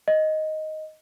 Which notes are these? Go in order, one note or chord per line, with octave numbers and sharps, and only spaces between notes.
D#5